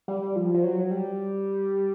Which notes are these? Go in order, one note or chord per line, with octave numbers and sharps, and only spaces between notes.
G3
F3
F3
F#3
G3